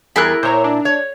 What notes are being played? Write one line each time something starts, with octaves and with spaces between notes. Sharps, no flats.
E2 G3 E4 G#4 A#4 B5 F#6
A#2 C5 C#5 A#5
D4
C#5